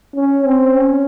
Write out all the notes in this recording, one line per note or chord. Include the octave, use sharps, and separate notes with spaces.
C#4
C4
C#4